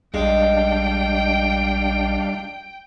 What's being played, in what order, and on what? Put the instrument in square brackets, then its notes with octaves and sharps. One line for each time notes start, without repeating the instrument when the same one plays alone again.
[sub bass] A#1 [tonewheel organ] G3 D4 F5 [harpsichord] G#3 [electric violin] G5